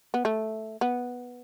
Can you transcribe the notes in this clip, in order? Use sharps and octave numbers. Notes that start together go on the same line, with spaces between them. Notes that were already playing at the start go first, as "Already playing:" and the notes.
B3
A3
B3